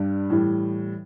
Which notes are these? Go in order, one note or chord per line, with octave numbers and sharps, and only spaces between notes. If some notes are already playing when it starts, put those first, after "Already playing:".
Already playing: G2 G3 D4
A2 E3 G3